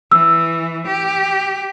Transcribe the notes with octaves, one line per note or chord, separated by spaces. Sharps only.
E3 E6
G4